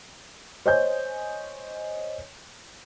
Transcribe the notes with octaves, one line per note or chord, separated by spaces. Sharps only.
C5 C#5 D#5 G#5 G6